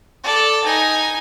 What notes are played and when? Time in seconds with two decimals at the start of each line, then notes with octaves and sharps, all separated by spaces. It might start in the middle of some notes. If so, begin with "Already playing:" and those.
0.23 A4 D5
0.64 D#4 G#5